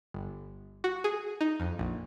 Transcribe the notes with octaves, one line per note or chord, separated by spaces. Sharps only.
G1
F#4
G#4
D#4
F2
A#1